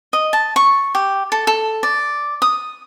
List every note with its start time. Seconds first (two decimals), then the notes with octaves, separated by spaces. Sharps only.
0.13 D#5
0.33 A5
0.56 C#6
0.95 G4
1.32 A4
1.47 A4
1.83 D5
2.42 D#6